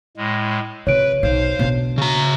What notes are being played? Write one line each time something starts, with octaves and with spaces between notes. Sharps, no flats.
A2 G#3
C3 F4 B4 C#5 D7
B1 C5 F5
B2 D4
C#3 F#4 A#5